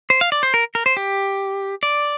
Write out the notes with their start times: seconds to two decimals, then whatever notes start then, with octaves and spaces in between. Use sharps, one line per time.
0.10 C5
0.21 F5
0.32 D5
0.43 C5
0.54 A#4
0.75 A#4
0.86 C5
0.97 G4
1.83 D5